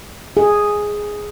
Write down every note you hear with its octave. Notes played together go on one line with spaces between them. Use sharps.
G#4